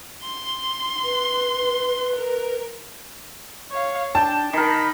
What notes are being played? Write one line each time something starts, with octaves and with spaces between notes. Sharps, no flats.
C6
B4
A#4
C#5 F5
D4 G5 A5
D#3 A#4 D#5 B5